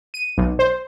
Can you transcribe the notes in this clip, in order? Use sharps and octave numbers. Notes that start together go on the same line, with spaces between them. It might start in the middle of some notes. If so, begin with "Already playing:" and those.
D#7
B1
C5